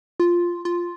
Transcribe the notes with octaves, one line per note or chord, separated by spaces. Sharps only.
F4
F4